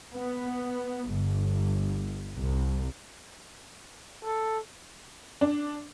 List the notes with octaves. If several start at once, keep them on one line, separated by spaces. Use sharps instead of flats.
B3
G1
C2
A4
D4